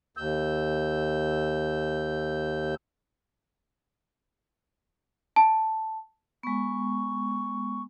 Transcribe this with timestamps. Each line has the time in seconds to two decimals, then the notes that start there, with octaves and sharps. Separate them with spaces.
0.17 D#2 E6 G6
5.36 A5
6.43 G#3 B3 C#6